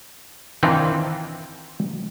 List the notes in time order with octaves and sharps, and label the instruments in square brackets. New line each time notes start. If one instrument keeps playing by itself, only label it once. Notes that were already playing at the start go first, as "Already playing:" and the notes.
[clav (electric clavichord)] D#3 E3 C4 D4 D#4 F4